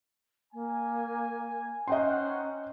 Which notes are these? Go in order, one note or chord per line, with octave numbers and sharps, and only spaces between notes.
A#3 G#5
C#4 D#4 C5 D#5 F#5 G5 C6